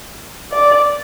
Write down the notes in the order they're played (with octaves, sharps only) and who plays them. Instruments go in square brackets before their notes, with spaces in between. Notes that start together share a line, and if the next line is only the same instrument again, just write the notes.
[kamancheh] D5